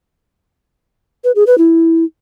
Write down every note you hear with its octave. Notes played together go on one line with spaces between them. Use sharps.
B4
G#4
B4
E4